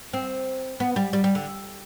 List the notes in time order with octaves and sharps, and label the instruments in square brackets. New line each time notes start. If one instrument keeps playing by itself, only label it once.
[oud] C4
B3
G3
G3
G3
D3